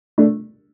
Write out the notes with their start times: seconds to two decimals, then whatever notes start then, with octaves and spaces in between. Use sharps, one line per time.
0.18 A3 D4